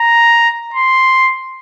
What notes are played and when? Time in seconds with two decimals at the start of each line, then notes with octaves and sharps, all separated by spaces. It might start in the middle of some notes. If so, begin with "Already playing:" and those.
Already playing: A#5
0.74 C6